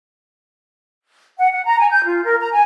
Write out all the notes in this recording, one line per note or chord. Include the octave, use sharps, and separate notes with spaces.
F#5
F#5
A#5
G#5
G6
F4
A#4
A#5
G#5